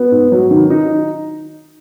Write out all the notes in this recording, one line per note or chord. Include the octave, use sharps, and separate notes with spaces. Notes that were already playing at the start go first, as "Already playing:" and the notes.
Already playing: B3
G#2
F#3
D#3
D#4